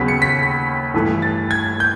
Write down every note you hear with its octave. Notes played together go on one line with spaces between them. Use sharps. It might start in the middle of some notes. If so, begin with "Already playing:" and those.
Already playing: D#2 C#3 F#3 B3 B6
C#7
B6
G2 E3 A3
A6
G#6
G6